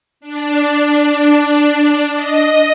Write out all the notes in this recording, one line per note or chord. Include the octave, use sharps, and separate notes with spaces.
D4
D#5